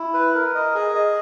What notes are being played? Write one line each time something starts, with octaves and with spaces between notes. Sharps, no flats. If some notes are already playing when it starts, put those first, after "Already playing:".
Already playing: E4
B4
A#4
D#5
G#4
D#5